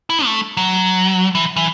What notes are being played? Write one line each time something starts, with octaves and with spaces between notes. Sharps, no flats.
E4
A3
F#3
E3
E3